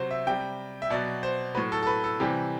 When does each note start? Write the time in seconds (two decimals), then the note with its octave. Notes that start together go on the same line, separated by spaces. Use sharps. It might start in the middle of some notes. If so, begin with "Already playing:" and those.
Already playing: C3 F#3 C5
0.11 E5
0.27 C3 G3 G5
0.82 E5
0.90 B2 F#3 D5
1.23 C5
1.55 A2 F#3 B4
1.72 A4
1.83 A4
1.87 B4
2.04 A4
2.20 C3 E3 G3 G4